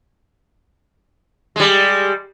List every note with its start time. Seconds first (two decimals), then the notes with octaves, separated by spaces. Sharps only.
1.56 G3 G#3